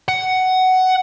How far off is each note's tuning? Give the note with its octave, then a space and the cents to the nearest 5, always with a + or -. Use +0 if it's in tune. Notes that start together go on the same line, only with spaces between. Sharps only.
F#5 +10